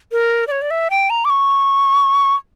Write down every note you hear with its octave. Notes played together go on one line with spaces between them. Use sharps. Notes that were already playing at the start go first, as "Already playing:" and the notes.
A#4
D5
C#5
D5
E5
G5
A#5
D6
C#6